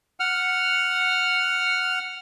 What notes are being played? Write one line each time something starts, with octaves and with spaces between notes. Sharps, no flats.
F#5 F6